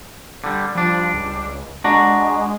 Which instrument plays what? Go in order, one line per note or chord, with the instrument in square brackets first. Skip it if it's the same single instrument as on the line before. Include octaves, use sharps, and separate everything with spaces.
[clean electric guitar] D3 G3
[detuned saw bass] F3 [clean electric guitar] G3 D4
[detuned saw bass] C#2
[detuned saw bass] G#3 [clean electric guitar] D4 F#4 A#5